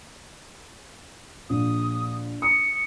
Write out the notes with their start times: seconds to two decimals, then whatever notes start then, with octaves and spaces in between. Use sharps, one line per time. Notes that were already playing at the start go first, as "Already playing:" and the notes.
1.50 A#1 D#6
2.42 D#6 C#7